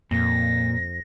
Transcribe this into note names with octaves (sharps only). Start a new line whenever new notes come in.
F2 A#2 A#6